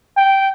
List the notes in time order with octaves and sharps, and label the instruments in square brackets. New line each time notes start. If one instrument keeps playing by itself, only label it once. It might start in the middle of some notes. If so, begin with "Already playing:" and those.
[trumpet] G5